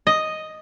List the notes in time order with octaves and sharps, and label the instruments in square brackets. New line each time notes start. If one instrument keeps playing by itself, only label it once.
[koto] D#5